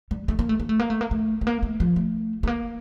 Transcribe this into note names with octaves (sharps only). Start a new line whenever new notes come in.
G3
A3
A#3
A3
A#3
A3
A#3
A3
A#3
A3
A3
A#3
A3
F3
A3
A3
A#3